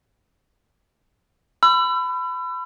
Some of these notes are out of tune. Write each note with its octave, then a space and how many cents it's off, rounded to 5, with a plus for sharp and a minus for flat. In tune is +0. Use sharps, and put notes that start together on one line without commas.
B5 +25 E6 +40